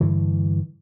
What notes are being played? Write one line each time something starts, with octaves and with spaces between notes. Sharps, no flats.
G2 D3 E3